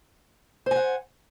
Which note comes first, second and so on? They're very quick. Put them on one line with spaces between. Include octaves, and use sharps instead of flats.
C5 G#5 F#5